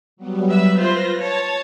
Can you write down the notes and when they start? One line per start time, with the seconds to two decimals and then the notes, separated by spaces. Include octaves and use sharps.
0.17 F#3 G3 B3
0.49 B4 E5
0.77 F4 B4 C5 A#6
1.20 C#5 A5 G#6